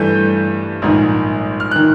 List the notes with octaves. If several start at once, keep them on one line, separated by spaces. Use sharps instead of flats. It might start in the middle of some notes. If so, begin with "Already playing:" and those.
Already playing: G2 E3 A3 G6
A#1 G#2 D#3
F6
D#3 F#6